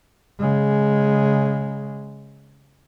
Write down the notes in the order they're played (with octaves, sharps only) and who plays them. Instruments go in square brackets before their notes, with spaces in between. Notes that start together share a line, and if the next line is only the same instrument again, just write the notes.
[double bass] C#3 G#3